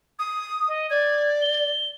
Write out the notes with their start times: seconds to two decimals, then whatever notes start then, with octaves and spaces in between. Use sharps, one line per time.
0.19 D#6
0.68 D#5
0.90 D5 G#6
1.42 G7